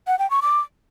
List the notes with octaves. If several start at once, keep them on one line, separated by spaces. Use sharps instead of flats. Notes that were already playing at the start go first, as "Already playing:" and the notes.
F#5
G5
C#6
D6